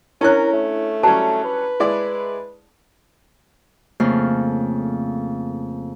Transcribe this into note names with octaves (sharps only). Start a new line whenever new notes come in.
C#4 D4 E4 A#4 C#5 F#6
A3
F#3 G3 C#4 A5
B4
G#3 E4 D5
F2 C#3 A3 A#3 F5